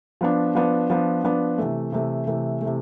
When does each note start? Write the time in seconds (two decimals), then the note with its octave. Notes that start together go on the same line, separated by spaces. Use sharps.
0.21 F3 B3 D4
0.55 F3 B3 D4
0.90 F3 B3 D4
1.24 F3 B3 D4
1.58 C3 E3 A3
1.92 C3 E3 A3
2.27 C3 E3 A3
2.61 C3 E3 A3